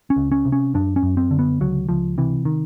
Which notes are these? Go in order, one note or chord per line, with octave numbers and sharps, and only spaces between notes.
C#4
C#2
C#4
C3
C#4
F#2 D4
C#4
F#2
C4
D3
B3
C#2 F#3
C#2 F3
C3 E3
D#3